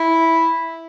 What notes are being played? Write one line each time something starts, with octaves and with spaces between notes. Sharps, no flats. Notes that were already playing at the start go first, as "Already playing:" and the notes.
Already playing: E4